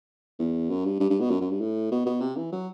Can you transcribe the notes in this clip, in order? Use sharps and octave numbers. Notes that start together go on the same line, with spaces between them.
E2
F#2
G2
G2
G2
B2
F#2
F#2
G2
A2
B2
B2
C3
E3
F#3